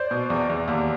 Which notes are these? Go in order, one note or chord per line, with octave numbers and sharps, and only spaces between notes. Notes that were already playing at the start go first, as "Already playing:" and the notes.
Already playing: C5 D5
B2
E2
E2
D#2